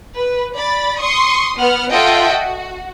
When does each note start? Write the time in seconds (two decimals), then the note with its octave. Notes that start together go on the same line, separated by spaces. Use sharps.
0.15 B4
0.57 D5 B5 A6
0.99 C6 C#6 D#6
1.57 B3 F#5 F6
1.91 F4 A4 D#5 E5 F#5 G5
2.31 F#4